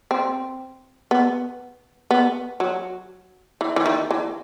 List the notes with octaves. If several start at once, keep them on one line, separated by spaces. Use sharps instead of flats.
C4
B3
B3
F#3
E3
E3
D#3
E3